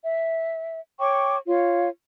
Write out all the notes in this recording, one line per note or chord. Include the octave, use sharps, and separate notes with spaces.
E5
C#5 G5 C#6 D6
F4 C#5 F5